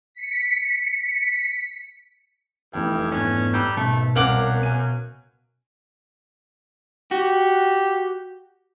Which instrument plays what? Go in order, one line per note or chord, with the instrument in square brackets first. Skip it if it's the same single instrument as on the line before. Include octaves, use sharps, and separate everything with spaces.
[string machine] B6 C#7
[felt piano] F1 E3 G5 [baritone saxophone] G2
[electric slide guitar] G#2 B3 D4 [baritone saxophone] C#4
[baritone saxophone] G3 [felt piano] A#5 E6 F#6
[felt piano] G#1 [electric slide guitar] B2 [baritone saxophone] A3
[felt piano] C2 A#4 D7 [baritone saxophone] F#2 [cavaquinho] F5 F#5 D6
[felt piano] G#5 D#7
[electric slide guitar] F#4 [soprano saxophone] G4